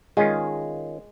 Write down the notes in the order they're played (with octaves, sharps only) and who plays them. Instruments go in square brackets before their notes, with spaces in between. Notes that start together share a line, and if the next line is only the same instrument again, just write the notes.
[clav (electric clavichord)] D#3 C#4 F4 [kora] G#3